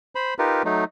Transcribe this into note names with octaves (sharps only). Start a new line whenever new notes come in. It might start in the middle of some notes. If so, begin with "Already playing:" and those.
C5 B5
D#4 F4 G4 A#4 B4
F#3 A3 D#4